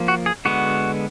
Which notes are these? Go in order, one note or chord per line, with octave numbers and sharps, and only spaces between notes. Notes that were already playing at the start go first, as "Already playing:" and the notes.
Already playing: F3 A#3
F#4
G#4
D3 G#3 B3 F#4